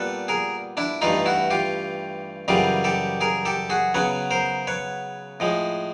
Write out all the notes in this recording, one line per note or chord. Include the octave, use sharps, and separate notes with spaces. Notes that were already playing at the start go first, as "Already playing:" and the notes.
Already playing: A#2 G3 B3 A4 B4
G#4 A#4
D4 E4
G2 E3 A3 D#4 F4
E4 F#4
F4 G4
F#2 C#3 E3 G3 F4 G4
G4 A4
G#4 A#4
G4 A4
F#4 G#4
C#3 F#3 B3 B4 C#5
A#4 C5
B4 C#5
A2 F3 G#3